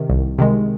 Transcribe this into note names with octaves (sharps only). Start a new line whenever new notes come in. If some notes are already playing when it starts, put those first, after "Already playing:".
Already playing: C3 D#3
C2
C3 D#3 G#3